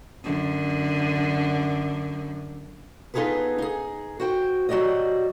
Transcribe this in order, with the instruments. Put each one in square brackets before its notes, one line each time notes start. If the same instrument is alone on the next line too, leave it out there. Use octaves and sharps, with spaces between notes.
[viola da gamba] F#2 D3
[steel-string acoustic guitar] B3 D#4 F4 G#4 A4 B4
D#4 G#4
F#4 C5 G5
F#3 F#4 G4 D5 D#5